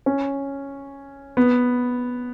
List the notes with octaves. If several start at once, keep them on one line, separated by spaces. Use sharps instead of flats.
C#4
B3